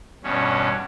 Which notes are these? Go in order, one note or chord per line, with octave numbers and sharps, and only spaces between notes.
E2 G2 B2 C#4